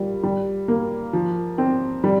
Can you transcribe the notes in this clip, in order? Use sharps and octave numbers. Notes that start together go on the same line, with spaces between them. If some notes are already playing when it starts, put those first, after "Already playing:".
Already playing: A#2 G3
G3
A#3
F3
C4
G3